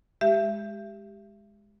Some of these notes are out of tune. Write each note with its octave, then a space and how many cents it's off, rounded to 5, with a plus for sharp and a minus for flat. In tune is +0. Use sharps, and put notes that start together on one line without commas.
G#3 +0 G4 +0 E5 +25